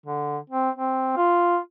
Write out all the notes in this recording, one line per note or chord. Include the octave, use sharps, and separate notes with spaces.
D3
C4
C4
F4